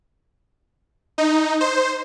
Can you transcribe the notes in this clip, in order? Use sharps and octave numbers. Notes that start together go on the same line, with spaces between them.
D#4
C5